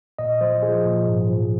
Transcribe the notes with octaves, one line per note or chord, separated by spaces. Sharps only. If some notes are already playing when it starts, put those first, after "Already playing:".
A#2 D#5
F3 C5
F3 G#4
A#2
G#2
F3